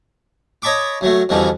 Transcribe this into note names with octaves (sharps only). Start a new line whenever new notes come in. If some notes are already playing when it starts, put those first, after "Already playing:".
C#5 D#5 A5 B5 C#6 D6
F#2 F#3 A3
F2 B2 D3 E3 F3 G3